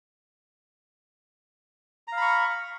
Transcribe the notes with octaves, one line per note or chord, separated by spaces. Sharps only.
F5 A#5 B5 C#6